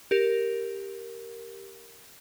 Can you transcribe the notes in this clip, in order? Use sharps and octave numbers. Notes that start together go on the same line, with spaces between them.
G4 A#4